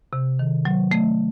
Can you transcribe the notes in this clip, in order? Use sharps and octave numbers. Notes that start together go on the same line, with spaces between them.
C3
D#3
F#3
A3